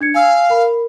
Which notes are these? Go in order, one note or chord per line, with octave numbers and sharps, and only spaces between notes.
D4 G#6 C#7
F5 G#5 E6
A#4 B5